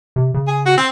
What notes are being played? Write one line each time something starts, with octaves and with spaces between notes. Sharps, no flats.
C3
C#3
G#4
F#4
C4